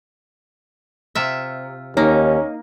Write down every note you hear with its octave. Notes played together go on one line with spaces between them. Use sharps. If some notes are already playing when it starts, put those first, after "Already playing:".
C3 F4 E5
D#2 A#3 C#4 D#4